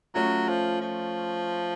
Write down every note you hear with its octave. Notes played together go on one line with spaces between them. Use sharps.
F#3 A3 C#4 F4
F3
F3